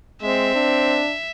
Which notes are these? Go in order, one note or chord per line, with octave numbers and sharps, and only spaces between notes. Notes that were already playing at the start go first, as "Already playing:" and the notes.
G#3 C4 E5
D4